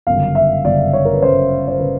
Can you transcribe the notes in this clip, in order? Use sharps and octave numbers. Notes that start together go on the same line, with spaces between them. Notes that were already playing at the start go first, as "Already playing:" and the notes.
G1 F#2 C#3 F5
E5
G1 F#2 C#3 D5
C#5
A#4
B4
G1 F#2 C#3 C5
C5
C#3 B4